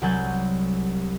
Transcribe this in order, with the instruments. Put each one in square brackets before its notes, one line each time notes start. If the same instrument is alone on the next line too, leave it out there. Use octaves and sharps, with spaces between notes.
[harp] C2 F#3 F#5 G#5 G6 A6